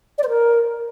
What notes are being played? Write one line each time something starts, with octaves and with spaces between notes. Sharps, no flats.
D5
C5
A#4